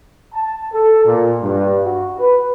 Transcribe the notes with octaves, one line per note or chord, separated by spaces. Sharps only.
A5
A4
A#2
G2
F#4
B4